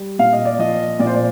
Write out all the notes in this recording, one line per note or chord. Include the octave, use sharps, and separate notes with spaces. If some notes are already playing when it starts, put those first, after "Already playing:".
Already playing: G3
A#2 F5
D#5
D5
F3 D#5
A#2 D5
C5
D5